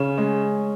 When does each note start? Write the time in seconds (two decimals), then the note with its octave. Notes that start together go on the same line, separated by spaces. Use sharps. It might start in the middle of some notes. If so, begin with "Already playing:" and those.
Already playing: C#3 C#4
0.18 G#3